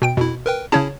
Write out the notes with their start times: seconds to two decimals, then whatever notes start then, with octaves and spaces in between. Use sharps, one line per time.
0.02 B2 G5 D7
0.17 F2 B2 E4
0.46 A#4 B4 G5
0.72 C#3 C#4 E4 G#4 C#5 A5